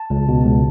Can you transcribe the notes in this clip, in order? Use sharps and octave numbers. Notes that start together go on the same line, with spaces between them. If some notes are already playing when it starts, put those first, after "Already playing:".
Already playing: A5
C#2
B2
C#2